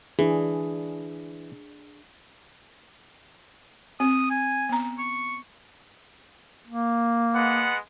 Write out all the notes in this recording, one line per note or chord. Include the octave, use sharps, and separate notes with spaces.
E3 D4 G#4
C4 D#6
G#5
B3 A#5
C#6
A#3
G#3 B3 F#5